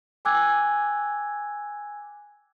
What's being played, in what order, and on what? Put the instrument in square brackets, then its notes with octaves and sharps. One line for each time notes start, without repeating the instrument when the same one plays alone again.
[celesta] G5 G#5 D6 E6 F#6 G#6